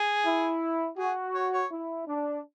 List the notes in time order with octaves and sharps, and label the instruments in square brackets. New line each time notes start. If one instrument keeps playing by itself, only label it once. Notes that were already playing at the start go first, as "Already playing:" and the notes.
Already playing: [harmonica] G#4
[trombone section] E4
[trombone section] F#4 [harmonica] G#4
[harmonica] C#5
C#5
[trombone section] E4
D4